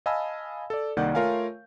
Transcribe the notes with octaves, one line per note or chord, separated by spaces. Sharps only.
D#5 F5 G#5 A5 B5 E6
A4 D5
C2 D#3 A#3 D5 F#5 G6
A3 F4 A#4 C#5 F5 G#5